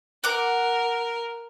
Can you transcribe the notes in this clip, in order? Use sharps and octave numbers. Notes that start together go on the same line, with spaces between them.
A#4 F#5 D6